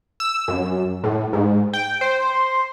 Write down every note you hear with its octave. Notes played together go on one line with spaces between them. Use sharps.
E6
F#2
A2
G#2
G5
C5